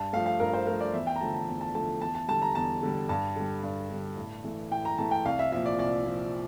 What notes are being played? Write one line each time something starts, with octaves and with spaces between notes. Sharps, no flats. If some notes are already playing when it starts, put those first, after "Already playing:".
Already playing: G2 A5
F3 A3 F5
F5
G2 A#4
C5
F3 A3 A#4
D5
E2 E5
G5
A#5
D3 F3 A3 A5
A5
E2
A5
D3 F3 A3 A5
E2 A5
A5
D3 G3 A5
A#5
E2 A5
D3 G3
G2 A5
D3 G3
G2
D3 G3
A2
E3 A3
A2 G5
A#5
E3 A3 A5
G5
C2 F5
E5
A#2 F3 E5
D5
C2 D5
A#2 F3